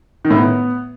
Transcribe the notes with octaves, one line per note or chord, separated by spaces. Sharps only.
D#3
A2
B3